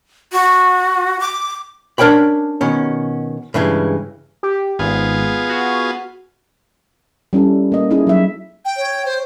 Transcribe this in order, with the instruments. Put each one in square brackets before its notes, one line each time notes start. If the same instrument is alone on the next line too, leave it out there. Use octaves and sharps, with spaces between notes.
[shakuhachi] F#4
D6
[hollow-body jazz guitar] C#4 D4 A#4 C#5 G5 B5
B2 D#3 C#4
G2 C#3 E3 G#3
[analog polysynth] G4
[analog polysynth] G#1 [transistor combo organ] B3 F4 G#4
[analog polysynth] F#4
[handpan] G3 C#4 E4 A4
A#3 D#5
A#3 C#4 D#4 E4 G#4
F#3 E5
[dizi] G5
[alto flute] C#5
[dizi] C5